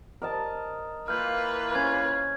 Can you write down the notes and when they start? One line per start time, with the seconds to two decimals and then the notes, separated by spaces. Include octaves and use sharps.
0.22 A#4 D#5 A5
1.08 E3 A#3 F4 B4 F6 G6
1.75 C#4 G#6